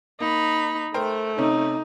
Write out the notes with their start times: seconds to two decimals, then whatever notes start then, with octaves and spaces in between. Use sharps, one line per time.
0.20 A#3 D#4 B5
0.94 A3 A#4 C5 G5
1.38 C3 C#4 D#4